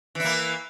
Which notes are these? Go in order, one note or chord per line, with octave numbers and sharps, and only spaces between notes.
E3 A#3 E4